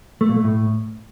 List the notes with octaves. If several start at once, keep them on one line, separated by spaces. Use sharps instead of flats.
A3
A#2
A3
A2